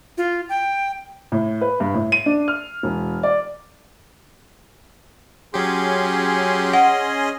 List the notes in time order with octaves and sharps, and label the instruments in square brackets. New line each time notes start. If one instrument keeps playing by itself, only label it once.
[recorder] F4
G5
[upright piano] A2
B4
G2
A2
D#7
D4
F6
E1
D5
[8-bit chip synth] F#3 G4 [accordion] C#4 G#4 C6
[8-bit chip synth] D#5 [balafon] F#5